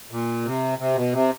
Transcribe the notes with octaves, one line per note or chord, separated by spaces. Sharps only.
A#2
C3
C3
B2
C3